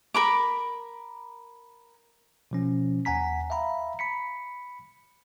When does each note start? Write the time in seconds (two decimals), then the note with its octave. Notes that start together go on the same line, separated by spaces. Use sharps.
0.14 A#4 B5 D6
2.51 B2 F3 C#4
3.05 D#2 F#5 G#5 A#5 B6
3.50 E5 F5 A#5 B5
3.99 B5 B6 C#7